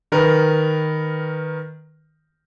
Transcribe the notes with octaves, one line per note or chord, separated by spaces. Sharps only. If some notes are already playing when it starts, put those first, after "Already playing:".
D#3 A#4 B4